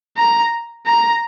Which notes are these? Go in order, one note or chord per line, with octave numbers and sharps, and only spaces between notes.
A#5
A#5